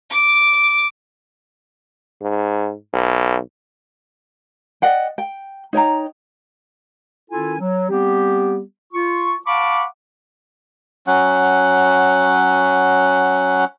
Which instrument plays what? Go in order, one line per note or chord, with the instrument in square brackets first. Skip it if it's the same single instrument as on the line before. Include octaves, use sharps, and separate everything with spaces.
[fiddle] D6
[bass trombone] G#2
B1
[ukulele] D5 D#5 F#5 G5
G5
D#4 C#5 G5 A#5
[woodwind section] D#3 C#4 E4 F4 A4 G#5
F#3
G3 B3 C4 G4
F4 C#6
F5 F#5 A5 B5 C#6 D6
[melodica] F#3 C#4 F#5